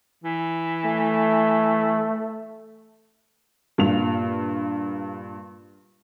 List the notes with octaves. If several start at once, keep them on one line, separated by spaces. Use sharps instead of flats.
E3
A3
G2 A#2 F7